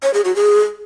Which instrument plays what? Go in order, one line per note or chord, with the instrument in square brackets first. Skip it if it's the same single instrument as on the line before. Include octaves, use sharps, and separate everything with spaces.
[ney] C#5
G#4
F#4
G#4